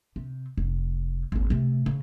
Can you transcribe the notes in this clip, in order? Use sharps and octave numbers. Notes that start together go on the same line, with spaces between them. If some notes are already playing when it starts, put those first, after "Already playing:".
C3
F1
G#1 D#2
C3 A3
C#3